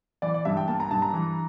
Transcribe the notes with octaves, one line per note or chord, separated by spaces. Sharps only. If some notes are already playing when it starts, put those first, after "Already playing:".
E3 D5
D5
G2 E5
G5
A#3 A5
A#5
G2 A5
A#5
E3